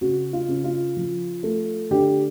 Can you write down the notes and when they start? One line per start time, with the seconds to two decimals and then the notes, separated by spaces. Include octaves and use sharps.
0.01 C#3 F#4
0.33 F4
0.49 C#3
0.64 F4
0.96 F3
1.43 A3
1.91 D3 G4